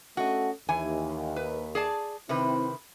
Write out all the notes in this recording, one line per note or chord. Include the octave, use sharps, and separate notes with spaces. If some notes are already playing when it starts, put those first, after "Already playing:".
A3 C#4 F#4 A4 D#5
D#2 E3 G#5
B4
G#4 D5 A5
C3 D#3 C4 E4 B4